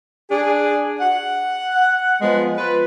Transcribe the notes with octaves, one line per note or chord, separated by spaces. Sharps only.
D4 G#4
F#5
F3 G#3 B3
F4 B4